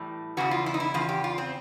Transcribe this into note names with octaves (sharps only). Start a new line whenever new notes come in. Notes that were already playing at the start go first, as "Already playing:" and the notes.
Already playing: A2 E3 G3
E2 C#3 E3 F#4
F4
E4
D#4
E4
E2 C#3 F4
G4
F4
C4